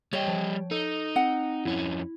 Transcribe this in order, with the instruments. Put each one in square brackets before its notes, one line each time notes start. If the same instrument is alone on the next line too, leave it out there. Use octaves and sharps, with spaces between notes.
[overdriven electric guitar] G3 D#5 [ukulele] C#5 G5
[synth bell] F3
[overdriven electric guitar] D#4 [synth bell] A4
[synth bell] C4 [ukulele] F#5
[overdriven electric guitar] F2 C#4 [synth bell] E4